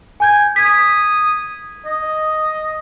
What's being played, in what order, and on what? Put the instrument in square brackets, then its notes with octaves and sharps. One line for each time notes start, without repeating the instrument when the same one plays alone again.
[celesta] G#5 G6 G#6
[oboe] D#6 [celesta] G#6 B6
[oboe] D#5